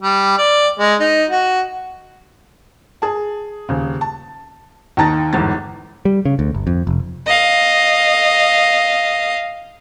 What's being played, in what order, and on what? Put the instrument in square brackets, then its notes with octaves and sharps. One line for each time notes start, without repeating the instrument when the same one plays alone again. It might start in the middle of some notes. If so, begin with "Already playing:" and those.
[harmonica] G3
D5
G#3
D#4
F#4
[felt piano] G#4 A5
D#1 C#3
A5
D#2 D#3 D#4 A5 A#5 A6
G1 E2 G#2 A6
[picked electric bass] G3
C#3
D2
G1
F2
F1
[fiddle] D#5 F5